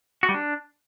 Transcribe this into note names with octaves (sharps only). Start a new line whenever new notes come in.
F#4
G3
D4